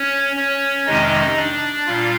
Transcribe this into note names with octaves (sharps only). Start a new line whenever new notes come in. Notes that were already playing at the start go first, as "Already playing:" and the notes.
Already playing: C#4 C#5
C#4 C#5
F2 C3 D#3 G#3 C#4 D#4 D#5
D4 D5
A#2 G3 F4 F5